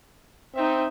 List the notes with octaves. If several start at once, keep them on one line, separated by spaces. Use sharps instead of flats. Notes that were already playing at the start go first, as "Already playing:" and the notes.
C4 D#4 E5